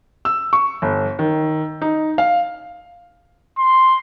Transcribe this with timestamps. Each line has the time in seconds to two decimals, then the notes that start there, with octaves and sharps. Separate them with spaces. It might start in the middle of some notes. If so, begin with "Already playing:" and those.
0.25 E6
0.53 C#6
0.82 G1
1.19 D#3
1.82 D#4
2.18 F5
3.58 C6